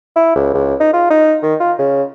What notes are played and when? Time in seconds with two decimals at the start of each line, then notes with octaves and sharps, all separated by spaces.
0.16 E4
0.36 C#2
0.54 C#2
0.80 D#4
0.93 F4
1.10 D#4
1.43 D#3
1.60 F4
1.79 C#3